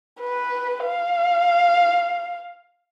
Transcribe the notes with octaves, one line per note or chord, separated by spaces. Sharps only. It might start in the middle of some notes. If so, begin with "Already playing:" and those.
B4
F5